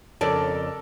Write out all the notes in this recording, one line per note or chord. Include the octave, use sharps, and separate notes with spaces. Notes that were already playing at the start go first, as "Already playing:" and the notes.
F2 C#3 A4 A#4 D5 A5